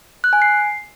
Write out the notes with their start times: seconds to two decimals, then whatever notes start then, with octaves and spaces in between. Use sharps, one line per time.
0.24 F#6
0.33 G#5
0.42 C7